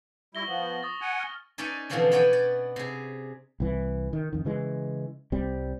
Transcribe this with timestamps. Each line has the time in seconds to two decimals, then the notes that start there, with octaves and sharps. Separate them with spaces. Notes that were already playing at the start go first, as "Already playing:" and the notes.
0.35 G3 E4 C#6 A#6 G7
0.47 F3 B3 F#7
0.83 C#6 D#6 A6
1.01 F#5 G#5
1.20 F6
1.58 C#4 D#4 D5 E5 G#5
1.90 B2 D3 E3 F3 C4 D4
2.11 B3 F#4 C#5 D5 G5 G#5
2.33 D5
2.76 C3 G#4
3.60 C2 E3
4.13 D#3
4.33 F2 D#3
4.45 C#3 E3 G#3
5.32 C2 G3 C4